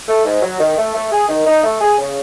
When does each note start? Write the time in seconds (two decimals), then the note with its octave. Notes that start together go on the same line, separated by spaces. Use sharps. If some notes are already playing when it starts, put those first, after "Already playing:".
0.09 A3
0.25 G#2
0.43 F#3
0.60 D#3
0.77 A3
0.95 A3
1.12 G#4
1.29 D#3
1.47 D#4
1.64 A3
1.81 G#4
1.98 C#3